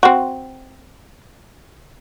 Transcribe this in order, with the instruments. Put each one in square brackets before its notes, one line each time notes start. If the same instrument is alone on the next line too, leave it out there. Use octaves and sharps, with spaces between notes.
[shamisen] C4 F#4